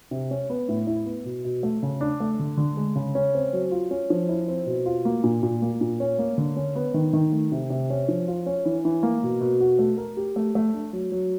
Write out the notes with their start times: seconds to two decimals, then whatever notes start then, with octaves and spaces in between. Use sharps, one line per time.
0.11 C3
0.31 C#4
0.50 B3
0.68 A2
0.87 E4
1.06 B3
1.25 B2
1.45 B2
1.63 A3
1.83 C#3
2.01 D4
2.20 A3
2.39 D3
2.57 D3
2.77 G#3
2.95 C#3
3.15 C#4
3.34 C4
3.53 F#3
3.71 F4
3.91 C#4
4.10 F3
4.29 E4
4.48 C4
4.66 B2
4.86 F4
5.05 A#3
5.24 A#2
5.43 A#2
5.62 A#3
5.81 A#2
6.00 C#4
6.19 A#3
6.38 D3
6.56 C#4
6.75 B3
6.94 D#3
7.13 D#3
7.32 A3
7.52 C3
7.70 C3
7.90 C#4
8.08 F3
8.28 F4
8.46 C#4
8.65 E3
8.85 E3
9.03 A#3
9.23 B2
9.41 B2
9.60 F#4
9.79 A3
9.98 A#4
10.17 G4
10.36 A3
10.55 A3
10.74 D4
10.93 F#3
11.12 F#3